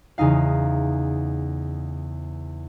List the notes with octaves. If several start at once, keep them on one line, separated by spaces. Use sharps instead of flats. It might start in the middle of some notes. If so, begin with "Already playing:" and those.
E2 C#3 D#4 F5